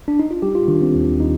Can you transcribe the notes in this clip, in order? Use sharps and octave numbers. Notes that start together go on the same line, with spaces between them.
D4
D#4
F4
G3 G4
F4
D#3 D4
C4
D#2
D#4